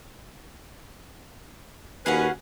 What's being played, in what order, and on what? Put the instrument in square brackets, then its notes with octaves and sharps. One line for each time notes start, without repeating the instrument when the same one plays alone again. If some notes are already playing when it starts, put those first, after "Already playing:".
[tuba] D#2 [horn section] C#4 F#4 B4 [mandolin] G#4 F5 F#5